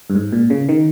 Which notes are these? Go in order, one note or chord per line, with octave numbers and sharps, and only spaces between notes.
G2
G#2
A#2
C#3
D#3